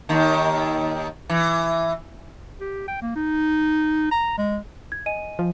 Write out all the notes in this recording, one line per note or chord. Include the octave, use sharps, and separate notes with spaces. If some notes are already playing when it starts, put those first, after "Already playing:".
D#2 D#3
E3
G4
G5
A#3
D#4
A#5
G#3
G#6
D#5 G#5 D#7
F3